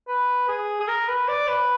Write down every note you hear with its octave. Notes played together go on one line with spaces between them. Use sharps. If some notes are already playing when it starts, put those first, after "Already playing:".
B4
G#4
G#4
A#4
B4
D5
B4